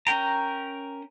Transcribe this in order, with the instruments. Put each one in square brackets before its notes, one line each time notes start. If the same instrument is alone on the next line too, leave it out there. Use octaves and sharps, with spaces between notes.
[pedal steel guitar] C#4 A#4 G5 A#5